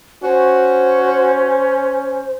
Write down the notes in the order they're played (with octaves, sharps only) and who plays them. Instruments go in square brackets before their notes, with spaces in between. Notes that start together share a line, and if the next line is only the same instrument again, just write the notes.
[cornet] C#4 [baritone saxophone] F#4 [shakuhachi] C5